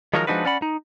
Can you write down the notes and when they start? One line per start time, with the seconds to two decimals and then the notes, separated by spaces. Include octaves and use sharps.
0.13 D#3 F3 F#3 G#3 D#4 A#4
0.27 F3 G#3 D4 D#4 F#4 B4
0.45 C#4 D5 F#5 B5
0.62 D#4